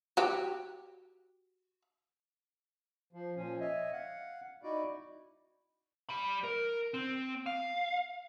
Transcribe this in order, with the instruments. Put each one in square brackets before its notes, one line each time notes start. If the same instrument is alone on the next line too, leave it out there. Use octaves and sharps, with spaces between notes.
[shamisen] F#4 G4
[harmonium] F3
A#2 F3 C#4
C#5 D#5 E5
F5 F#5
D#4 E4 F#4 D5
[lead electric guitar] G3 B5
A#4
C4
F5